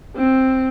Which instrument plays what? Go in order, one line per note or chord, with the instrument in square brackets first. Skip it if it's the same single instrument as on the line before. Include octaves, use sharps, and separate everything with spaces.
[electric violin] C4